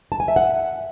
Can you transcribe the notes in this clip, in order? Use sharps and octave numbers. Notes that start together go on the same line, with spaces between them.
A5
G#5
E5
F#5